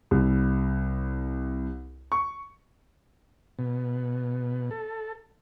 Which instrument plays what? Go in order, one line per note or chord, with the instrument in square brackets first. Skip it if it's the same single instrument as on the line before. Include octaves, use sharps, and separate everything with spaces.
[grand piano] C2
C#6
[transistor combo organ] B2
A4